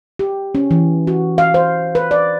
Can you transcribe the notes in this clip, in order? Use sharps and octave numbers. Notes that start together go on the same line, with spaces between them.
G4
C#4
E3
F#4
F5
C5
B4
D5